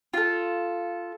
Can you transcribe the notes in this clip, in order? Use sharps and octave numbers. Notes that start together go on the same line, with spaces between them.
F4 A4